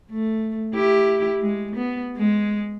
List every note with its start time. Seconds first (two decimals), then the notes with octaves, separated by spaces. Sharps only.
0.10 A3
0.74 E4 G4
1.41 G#3
1.75 B3
2.17 G#3